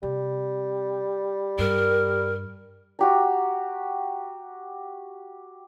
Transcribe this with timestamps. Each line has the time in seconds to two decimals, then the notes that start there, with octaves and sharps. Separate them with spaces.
0.03 C3 G3
1.59 G2 A#4
2.99 F#4 G4 A#5